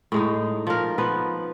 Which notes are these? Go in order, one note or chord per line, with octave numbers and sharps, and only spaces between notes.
A2 G#3 D#4
F3 A#4
F3 B3 B4